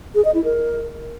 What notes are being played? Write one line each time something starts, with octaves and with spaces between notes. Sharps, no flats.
G#4
D#5
E4
A#4